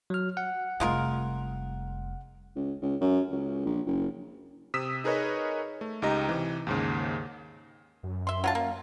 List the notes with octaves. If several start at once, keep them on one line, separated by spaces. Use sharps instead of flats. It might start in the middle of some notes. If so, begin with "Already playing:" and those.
F#3 F6
F#5
F1 G3 G#3 F4 A#4
C#2
C#2
F#2
C#2
A#1
F#1
C3 D#6 E6 B6 E7
D#4 G#4 A#4 B4 C#5 D#5
A3
C#2 D#4 G4 D#5 A#5
C3 E3
D#2 G#2 C#3
F#2
E5 C6
F#3 F4 A5
A#3